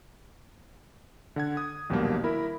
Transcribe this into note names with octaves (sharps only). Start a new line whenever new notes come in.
D3 F#5 G#6
D#6
A#1 D#2 B2 F#3 G3 A#3
E4 A#4 B5